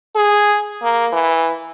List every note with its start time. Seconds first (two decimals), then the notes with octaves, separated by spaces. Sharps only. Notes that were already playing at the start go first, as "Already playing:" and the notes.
0.16 G#4
0.83 A#3
1.13 E3